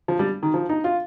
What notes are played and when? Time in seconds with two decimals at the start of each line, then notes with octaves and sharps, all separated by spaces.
0.08 F3
0.19 G3
0.43 D#3
0.54 F3
0.69 D#4
0.84 F4